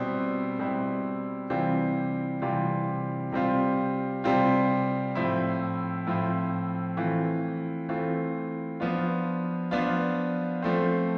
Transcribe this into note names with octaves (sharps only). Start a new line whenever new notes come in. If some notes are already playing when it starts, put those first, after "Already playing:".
Already playing: B2 G3 C4 E4
B2 G3 C4 E4
C3 E3 G3 C4 F4
C3 E3 G3 C4 F4
C3 G3 C4 F4
C3 G3 C4 F4
A2 F3 C4 E4
A2 F3 C4 E4
E3 A3 C4 F4
E3 A3 C4 F4
F3 B3 D4 F4
F3 B3 D4 F4
F3 A3 C4